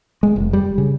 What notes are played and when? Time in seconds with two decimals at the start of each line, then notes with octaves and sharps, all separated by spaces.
0.23 G#3
0.36 F1
0.53 G3
0.78 C#3